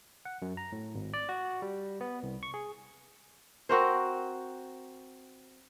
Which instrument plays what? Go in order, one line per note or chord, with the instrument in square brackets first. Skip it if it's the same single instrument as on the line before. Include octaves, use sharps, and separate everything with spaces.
[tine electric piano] F#5
F#2
A#5
A2
G#1
D5
F#4
G3
B3
C2
C#6
G#4
[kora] C4 F#4 A#4 C5